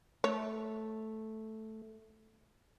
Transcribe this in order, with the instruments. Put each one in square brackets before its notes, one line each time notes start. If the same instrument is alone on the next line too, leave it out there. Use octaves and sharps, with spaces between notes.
[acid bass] A3 [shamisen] C#5